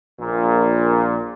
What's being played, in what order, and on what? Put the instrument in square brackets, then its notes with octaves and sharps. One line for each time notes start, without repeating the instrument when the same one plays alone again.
[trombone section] A#1 A#2